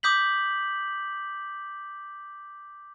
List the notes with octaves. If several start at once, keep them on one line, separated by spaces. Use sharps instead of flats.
D6 D#6 G6 B6 F#7